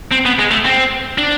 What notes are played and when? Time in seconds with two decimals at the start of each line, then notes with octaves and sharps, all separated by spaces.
0.11 C4
0.25 B3
0.39 G#3
0.51 A3
0.65 C4
1.18 D4